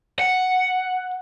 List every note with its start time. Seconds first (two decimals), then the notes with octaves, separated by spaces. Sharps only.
0.19 F#5